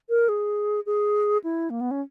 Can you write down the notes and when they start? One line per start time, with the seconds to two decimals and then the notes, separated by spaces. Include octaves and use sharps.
0.09 A#4
0.29 G#4
0.86 G#4
1.44 E4
1.70 A#3
1.81 B3
1.91 C#4